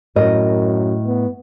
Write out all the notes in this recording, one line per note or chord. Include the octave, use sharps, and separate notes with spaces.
F#2 A2 A#4 D#5
B3